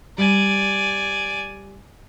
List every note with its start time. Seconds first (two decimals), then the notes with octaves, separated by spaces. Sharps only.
0.18 G3 D5 G#5